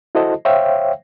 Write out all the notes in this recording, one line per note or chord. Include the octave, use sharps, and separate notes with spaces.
E4 F#4 A4 C5 D#5 A5
C5 C#5 E5 F5 G5